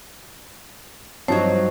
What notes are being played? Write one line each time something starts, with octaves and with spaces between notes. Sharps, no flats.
G2 F3 F#3 C4 D#4 C5 C#5 A5